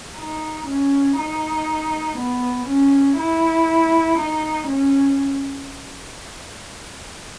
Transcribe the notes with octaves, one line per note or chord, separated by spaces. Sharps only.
D#4
C#4
D#4
B3
C#4
E4
D#4
C#4